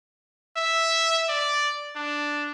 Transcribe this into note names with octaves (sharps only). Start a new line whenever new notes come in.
E5
D5
D4